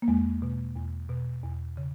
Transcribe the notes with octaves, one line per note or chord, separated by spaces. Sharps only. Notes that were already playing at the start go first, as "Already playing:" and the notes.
A#3
E2 G#3
B2
E2
B2
E2
C#3